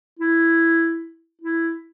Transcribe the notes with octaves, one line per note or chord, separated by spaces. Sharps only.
E4
E4